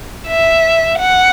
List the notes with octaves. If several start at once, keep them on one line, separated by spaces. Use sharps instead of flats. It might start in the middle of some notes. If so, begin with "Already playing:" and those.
E5
F#5